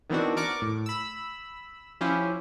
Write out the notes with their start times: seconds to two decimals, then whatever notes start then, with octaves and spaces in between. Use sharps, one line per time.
0.10 D#3 E3 B3 C4 D4 F#4
0.37 A#4 D5 C#6 D6
0.62 A2
0.86 B5 E6
2.01 F3 C#4 E4 F4 G4 C5